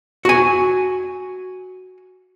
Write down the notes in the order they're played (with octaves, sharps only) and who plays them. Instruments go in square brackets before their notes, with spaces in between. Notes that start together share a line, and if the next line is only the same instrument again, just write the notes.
[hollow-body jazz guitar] F#4 G#5